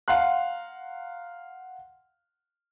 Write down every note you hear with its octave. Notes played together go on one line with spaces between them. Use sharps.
F5 F#5 A#5 C6 F#6